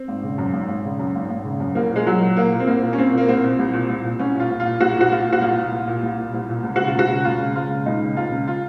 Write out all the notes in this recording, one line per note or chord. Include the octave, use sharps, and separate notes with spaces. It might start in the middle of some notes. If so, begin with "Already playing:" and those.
Already playing: C4
G#1
C#3
F#2
G#1
G#1
C#3
F#2
G#1
G#1
C#3
F#2
C2 A#3
A#2
G#3
C2 F#3
A#2
C2 A#3
A#2
C4
C2 A#3
A#2
C#4
C2 C4
A#2 A#3
C2 C4
A#2
C2
A#2
C2
A#2
C2 C#4
A#2 F4
C2
F4
A#2
C2 F#4
A#2 F#4
C2 F4
A#2
F#4
C2 F4
A#2
C2
A#2
C2
A#2
C2
A#2
C#2
C#3 F#4
F4
C#2 F#4
C#3
C#2 F4
C#3
C#2 F4
C#3
C#2 D#4
C#3
C#2 F4
C#3
F4